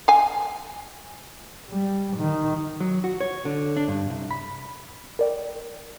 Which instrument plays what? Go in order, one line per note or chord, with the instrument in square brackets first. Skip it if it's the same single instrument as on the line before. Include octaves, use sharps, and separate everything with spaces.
[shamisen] F5 G#5
[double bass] G3
D#3
[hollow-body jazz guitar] F#3
F#4
C#5
D3
D4
G2
C2
B5
[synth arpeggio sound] A#4 D5 G5